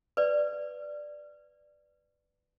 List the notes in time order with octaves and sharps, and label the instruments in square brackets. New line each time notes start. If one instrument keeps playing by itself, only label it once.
[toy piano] B4 D5